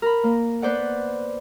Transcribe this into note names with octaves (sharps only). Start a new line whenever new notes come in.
A#4 B5
A#3
B3 B4 C5 D5 F#5